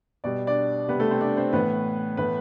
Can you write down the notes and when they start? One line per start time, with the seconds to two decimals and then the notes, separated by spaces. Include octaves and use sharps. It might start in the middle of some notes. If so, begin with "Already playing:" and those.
0.24 B2 G3 D5
0.47 D4 D5
0.88 C3 G3 B3 B4
0.99 A3 A4
1.10 C4 C5
1.21 D4 D5
1.37 C4 C5
1.53 A2 E3 A3 B3 B4
2.17 A2 E3 A3 B3 B4